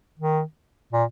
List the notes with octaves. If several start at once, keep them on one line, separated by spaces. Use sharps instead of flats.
D#3
A#2